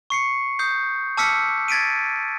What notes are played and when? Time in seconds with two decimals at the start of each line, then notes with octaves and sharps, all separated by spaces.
0.10 C#6 C7 C#7
0.59 D#6 G6 C7
1.17 A5 D6 E6 F6 B6 C#7
1.68 G#6 A6 B6 D7 D#7